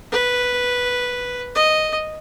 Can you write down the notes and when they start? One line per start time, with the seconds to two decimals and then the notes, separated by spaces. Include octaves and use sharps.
0.12 B4
1.55 D#5